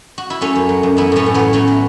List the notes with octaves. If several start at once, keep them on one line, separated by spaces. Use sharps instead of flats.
F#4
E4
F#3 A3 C#4
F#2
F#3
F#2
E3 B3 E4
A2 A3 C#4
A2
E3 F#3 B3
F#3 A3 C#4
F#3